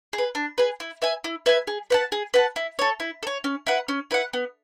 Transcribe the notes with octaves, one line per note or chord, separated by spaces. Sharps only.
G#4
B4
D4
G#4 B4
E4
B4 E5 G#5
E4
B4 E5 G#5
G#4
B4 F#5 A5
G#4
B4 F#5 A5
E4
A4 C#5
E4
A4
C#5
C#4
E4 B4 F#5
C#4
E4 B4 F#5
B3